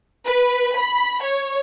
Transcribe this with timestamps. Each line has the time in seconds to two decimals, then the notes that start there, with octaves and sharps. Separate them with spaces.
0.25 B4
0.78 B5
1.23 C#5